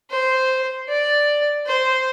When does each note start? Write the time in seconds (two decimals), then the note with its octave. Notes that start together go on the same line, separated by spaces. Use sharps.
0.10 C5
0.89 D5
1.67 C5